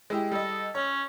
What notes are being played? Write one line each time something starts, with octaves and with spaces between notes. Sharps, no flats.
G#3 E4 G4
G3 A4 D#5
C#4 C#5